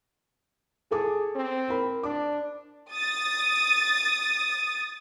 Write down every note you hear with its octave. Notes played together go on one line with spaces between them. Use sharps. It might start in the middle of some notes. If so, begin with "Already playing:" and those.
G#4 A4 A5 D6
C4
A#4 B5
D4 D6
D#6 A6